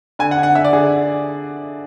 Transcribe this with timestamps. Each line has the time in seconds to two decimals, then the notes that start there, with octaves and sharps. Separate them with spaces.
0.19 D3 G#5
0.31 F#5
0.38 D3
0.43 F#5
0.55 D3 E5
0.64 D5
0.73 D3 G#4